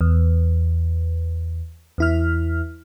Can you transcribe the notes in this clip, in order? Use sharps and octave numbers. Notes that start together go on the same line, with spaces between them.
E2
E2 E4 F6